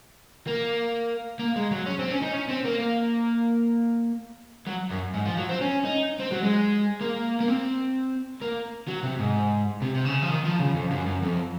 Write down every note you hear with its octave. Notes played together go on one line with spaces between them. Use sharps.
A#3
A#3
G#3
F#3
C#4
C4
C#4
D#4
C#4
C4
A#3
A#3
F#3
F#2
G#2
F3
F#3
C4
C#4
D#4
C4
F#3
G#3
A#3
A#3
C4
A#3
F#3
C3
G#2
C3
C3
C#3
F3
D#3
F3
C#3
F2
F#2
F#2
F2